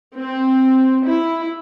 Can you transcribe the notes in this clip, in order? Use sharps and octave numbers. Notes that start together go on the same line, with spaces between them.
C4
E4